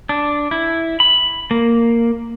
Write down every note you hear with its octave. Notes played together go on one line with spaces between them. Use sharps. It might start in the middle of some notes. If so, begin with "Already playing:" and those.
D4
E4
B5
A#3